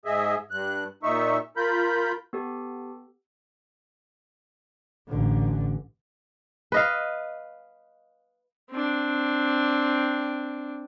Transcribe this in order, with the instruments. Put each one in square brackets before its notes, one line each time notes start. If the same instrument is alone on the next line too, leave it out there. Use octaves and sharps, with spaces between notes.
[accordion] G#2 G#4 D#5 E5
G2 F#6
A#2 D#4 E5 C#6
F4 A#4 B5 G6
[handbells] B3 G4 A4
[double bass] A1 D3
[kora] B4 D#5 F5
[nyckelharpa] C4 D4